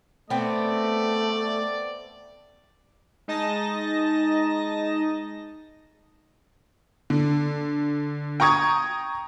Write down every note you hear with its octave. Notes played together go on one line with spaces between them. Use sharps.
A3 B3 C4 D5
G#3 D#4 D#5 A5 A#6
D3
G5 A#5 C#6 D#6 G#6